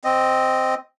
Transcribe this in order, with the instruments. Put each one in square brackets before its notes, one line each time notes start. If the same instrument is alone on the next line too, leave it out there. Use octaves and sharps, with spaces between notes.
[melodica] C4 D#5